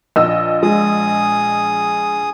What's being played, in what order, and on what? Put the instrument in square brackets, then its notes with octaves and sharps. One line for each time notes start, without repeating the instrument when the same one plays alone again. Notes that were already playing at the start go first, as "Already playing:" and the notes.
[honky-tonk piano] A#1 D#5 E6
[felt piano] G#3 [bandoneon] G#4 D#6